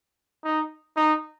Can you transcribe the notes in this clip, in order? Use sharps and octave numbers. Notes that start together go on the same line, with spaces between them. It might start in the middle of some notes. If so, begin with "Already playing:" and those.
D#4
D#4